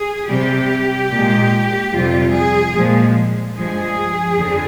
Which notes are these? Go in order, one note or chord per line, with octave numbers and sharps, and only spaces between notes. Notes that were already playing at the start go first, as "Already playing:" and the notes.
Already playing: G#4
C3 G3 G4
A#2 G#3
F2 C3 G3 F4
G#4
A#2 F3 G#3
G2 F3 G#3 G#4
F2 D3